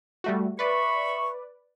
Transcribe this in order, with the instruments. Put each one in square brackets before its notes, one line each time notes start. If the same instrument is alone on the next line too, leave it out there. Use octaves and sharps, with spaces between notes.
[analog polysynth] G3 A3 F#4
[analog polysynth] B4 D5 [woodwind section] E5 B5 C#6